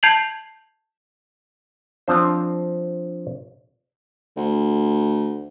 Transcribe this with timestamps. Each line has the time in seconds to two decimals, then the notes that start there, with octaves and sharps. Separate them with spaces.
0.03 A5 G6 G#6 C7 F7 F#7
2.08 F3 C4 D4 C5
4.37 D2